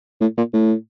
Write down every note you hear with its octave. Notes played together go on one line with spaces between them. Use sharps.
A2
A#2
A2